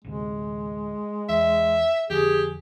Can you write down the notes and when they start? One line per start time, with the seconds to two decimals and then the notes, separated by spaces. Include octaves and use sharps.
0.05 A1 D2 C3 G#3
1.29 E2 E5
2.10 F2 D3 G4 G#4